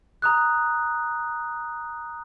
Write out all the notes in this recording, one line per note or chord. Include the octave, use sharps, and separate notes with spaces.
A#5 D#6 F#6